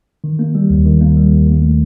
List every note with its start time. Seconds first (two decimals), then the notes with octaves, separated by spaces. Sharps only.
0.24 D#3
0.39 A#3
0.55 G3
0.70 D#2
0.85 D#3
1.01 A#3
1.16 G3
1.32 D#2
1.47 D#3
1.62 A3